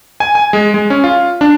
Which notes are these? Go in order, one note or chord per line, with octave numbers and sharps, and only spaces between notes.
G#5
G#5
G#3
G#3
C#4
F4
D4